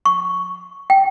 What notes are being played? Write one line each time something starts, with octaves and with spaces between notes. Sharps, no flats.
C#6
G5